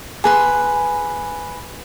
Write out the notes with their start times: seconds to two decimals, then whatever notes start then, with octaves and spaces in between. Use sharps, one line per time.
0.24 G#4 B4 C6